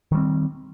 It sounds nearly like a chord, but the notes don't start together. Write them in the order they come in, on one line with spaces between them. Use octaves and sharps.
D#3 G3 C4